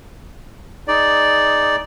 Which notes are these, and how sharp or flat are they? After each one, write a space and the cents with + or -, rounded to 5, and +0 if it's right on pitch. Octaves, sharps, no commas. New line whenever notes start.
D#4 +0 G#4 +5 D5 +0